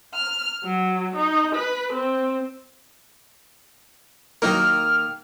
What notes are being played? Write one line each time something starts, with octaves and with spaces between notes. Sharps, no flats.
F6
F#3
D#4
B4
C4
D#3 F#3 A#3 D#4 A#4 F6